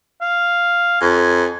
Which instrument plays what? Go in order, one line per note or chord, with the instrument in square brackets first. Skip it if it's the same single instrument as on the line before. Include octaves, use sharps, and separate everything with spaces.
[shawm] F5
[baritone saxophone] F2 [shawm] G#5